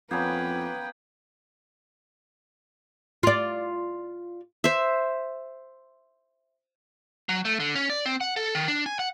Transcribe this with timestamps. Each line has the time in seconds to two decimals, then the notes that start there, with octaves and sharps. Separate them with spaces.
0.11 F2 A#3 B3 C#4 B4 G5 G6 G#6
3.23 F4 D5
4.64 C5 E5
7.29 F#3
7.45 A3
7.60 D3
7.75 C#4
7.90 D5
8.06 C4
8.21 F#5
8.36 A4
8.55 D#3
8.68 D4
8.86 G#5
8.99 F#5